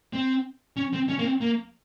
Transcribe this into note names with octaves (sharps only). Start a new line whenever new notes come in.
C4
C#4
C4
C#4
A#3
C4
A#3